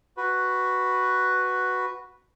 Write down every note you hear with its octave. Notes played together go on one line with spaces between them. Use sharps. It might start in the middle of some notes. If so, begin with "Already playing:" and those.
F#4 B4